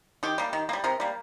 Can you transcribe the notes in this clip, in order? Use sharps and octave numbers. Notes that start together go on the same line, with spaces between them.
D#3 G4
G3 A#3
D#3
A#3
G3
C3 A#4
G3 A#3